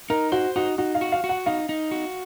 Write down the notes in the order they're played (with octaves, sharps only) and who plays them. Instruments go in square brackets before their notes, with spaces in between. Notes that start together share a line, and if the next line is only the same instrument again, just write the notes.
[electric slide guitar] D#4 [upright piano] A#4
[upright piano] F#4 [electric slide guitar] C5
[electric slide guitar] D#4 [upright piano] F#4
[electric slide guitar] D#4 [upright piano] F#4
[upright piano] F5
[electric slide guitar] F#4
[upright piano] F5
[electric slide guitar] F#4
[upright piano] F#5
[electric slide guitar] D#4 [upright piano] F5
[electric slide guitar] D#4
F#4